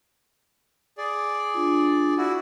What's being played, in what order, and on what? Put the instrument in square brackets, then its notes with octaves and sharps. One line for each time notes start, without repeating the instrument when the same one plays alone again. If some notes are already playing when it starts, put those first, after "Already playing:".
[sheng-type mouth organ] G#4 D5
[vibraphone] D4 F4
[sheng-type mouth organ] E4 F#4